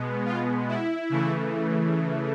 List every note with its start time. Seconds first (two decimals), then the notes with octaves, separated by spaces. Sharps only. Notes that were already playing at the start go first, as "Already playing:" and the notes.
Already playing: B2 G#3 B3
0.25 F4
0.68 E4
1.10 C#3 E3 A3